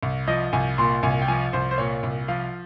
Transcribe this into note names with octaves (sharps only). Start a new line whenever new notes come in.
C2
F3 D#5
C2 G#5
A#2 C6
C2 G#5
G5
F3 G#5
C2 C5
C5
A#2 C#5
C2
F3 F5